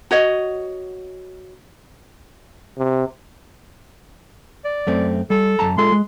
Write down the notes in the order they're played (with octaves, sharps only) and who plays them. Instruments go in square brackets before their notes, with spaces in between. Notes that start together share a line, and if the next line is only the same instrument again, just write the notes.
[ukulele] F#4 C#5 D#5
[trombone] C3
[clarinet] D5
[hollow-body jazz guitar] F#2 A3 C4
[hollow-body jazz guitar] G3 [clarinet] A4
[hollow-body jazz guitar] F#2 A5 A#5
[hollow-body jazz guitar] G#3 F4 A4 [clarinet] C6
[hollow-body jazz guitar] G#3